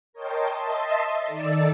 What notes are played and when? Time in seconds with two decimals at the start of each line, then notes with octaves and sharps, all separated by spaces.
0.13 A#4 C#5 D#5 G5 A5 C6
0.50 D#5 E5 A5 C6
1.25 D#3 D#4 A4 D5 E6